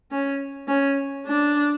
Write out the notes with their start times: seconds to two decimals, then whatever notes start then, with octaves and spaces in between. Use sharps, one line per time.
0.11 C#4
0.68 C#4
1.26 D4